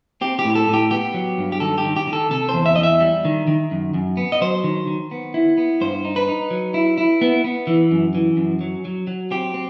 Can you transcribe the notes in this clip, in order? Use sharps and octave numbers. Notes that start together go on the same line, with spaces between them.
C4 G4
G4
A2
A4
A2
G4
B3 G4
F#3
G2
G4
D#3 A4
G4
D#3
G4
D#3
A4
C3 A4
E2 C5
E5
E2 D#5
E5
G3
D#3
D#3
F#2
F#2
B3
D#5
F#3 C5
D#3
D#3
B3
E4
B3
G2 C5
D#4
B4
D#4
F#3
E4
E4
B3
B3
E3
F#2
E3
F#2
F#3
F#3
F#3
C4 G4
C4